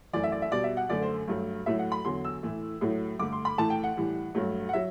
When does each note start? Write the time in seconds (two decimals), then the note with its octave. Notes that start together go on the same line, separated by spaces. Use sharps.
0.13 F#2 E3 A3 D5
0.24 E5
0.32 D5
0.42 E5
0.51 B2 G3 D5
0.64 E5
0.77 F#5
0.89 F#2 D3 A3 D5
1.02 C5
1.28 G2 F#3 A3
1.66 A2 F#3 A3 E5
1.79 F#5
1.92 B5
2.05 E2 D3 F#3 C6
2.25 E6
2.43 A2 E3 A3
2.81 A2 F#3 A3
3.19 G2 D3 A3 D6
3.32 C6
3.45 B5
3.58 A2 E3 A3 A5
3.70 G5
3.84 F#5
3.97 A2 E3 G3
4.35 G2 F#3 A3
4.69 F#5
4.73 F#3 E5